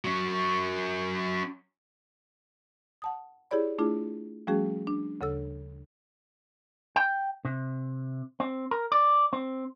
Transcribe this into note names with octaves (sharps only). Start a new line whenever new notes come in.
F#3 C#4
F#5 A5 D#6
E4 G4 G#4 C#5 D5 B5
A3 D4 E4 F4 G#4
F3 G3 A3 C#4 F#4 G#4
D4
D2 C#3 A4 E6
G5
C3
C4
A#4
D5
C4